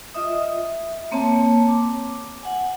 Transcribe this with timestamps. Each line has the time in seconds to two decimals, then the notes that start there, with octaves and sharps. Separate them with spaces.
0.14 F4 D#5 E5 D#6
0.42 E5
1.12 A#3 C4 C#5 A5
1.68 D6
2.43 F#5 G#5